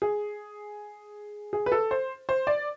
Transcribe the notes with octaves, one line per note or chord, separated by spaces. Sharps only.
G#4
G#4
B4
A4
C5
C5
D5